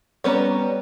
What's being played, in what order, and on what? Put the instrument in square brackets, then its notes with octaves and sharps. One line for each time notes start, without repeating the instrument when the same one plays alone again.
[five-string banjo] G3 B3 C#4 [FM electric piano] C#5 D5 A#5